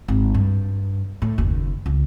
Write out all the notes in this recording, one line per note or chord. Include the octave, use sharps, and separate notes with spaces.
G#1
G2
A2
F#1 D#2
C#2